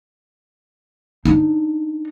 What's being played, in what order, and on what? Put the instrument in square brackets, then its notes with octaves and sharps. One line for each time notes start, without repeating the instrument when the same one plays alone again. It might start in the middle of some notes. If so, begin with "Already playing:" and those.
[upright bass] D4 D#4